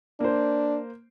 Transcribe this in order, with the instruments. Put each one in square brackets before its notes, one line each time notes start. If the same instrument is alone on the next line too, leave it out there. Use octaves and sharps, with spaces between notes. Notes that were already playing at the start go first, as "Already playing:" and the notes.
[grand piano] A#3 C5 [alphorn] D4